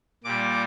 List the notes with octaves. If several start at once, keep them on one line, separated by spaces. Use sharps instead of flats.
A#2 G3 D6